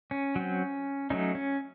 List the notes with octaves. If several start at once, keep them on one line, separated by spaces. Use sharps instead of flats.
C#4
F#3 C4
F#3 A3 C#4 D#4
C#4